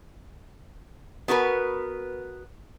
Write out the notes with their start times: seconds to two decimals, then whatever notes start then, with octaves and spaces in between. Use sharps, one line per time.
1.28 B3 F#4 A#4 B4